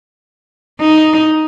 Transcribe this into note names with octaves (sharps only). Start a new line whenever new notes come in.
D#4